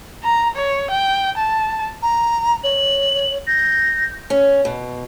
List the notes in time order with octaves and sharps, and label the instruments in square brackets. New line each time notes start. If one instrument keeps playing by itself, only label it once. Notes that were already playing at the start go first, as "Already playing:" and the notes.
[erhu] A#5
C#5
G5
A5
[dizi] A#5
[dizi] C#5 [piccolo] F#7
[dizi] G6 [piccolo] A#6
[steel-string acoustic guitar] C#4
B2